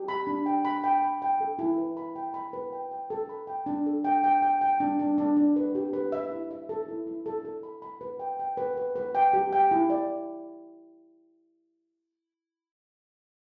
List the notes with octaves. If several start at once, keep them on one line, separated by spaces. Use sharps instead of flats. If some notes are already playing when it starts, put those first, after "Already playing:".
Already playing: G4
B5
D4
G5
B5
G5
B5
G5
A4
E4
B4
B5
G5
B5
B4
G5
G5
A4
B5
G5
D4
A4
G5
G5
G5
G5
D4
D4
D4
D4
B4
G4
B4
E5
E4
E5
A4
E4
E4
A4
A4
B5
B5
B4
G5
G5
B4
B4
B4
G5
G4
G5
E4
D5